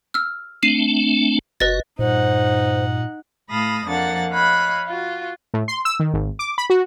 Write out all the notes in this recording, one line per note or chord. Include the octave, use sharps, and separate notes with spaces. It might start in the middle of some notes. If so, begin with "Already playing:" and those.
E6 F6
A3 C4 D4 C7 D#7
F#1 F#4 B4 D#5 A6
G2 A#2 D#4 C5 F#5
A2 F5 A5 B5 D#6 A#6
F2 F3 A#3 D4 F#5 A6
C#5 D#5 F5 B5 F#6
F4 F#4
A2
C6
E6
D#3
G#1
D6
B5
F#4